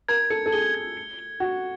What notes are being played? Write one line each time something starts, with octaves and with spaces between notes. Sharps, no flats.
A#4 G#6
A4 C#7
A4
G#4 G7
G#6
C#7
G7
F#4 G#6